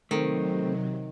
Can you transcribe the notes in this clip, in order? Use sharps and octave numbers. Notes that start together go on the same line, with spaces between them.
C3 D#3 F#3 A3 C4